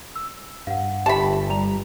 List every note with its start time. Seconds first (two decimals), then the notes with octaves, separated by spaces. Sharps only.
0.16 E6
0.67 G2 F5 F#5
1.06 G1 G4 E5 G5 A5 B5
1.50 G3 A#5 F7